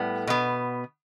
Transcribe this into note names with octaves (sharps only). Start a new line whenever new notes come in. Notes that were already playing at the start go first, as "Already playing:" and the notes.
Already playing: A2 G3 B3
B2 B3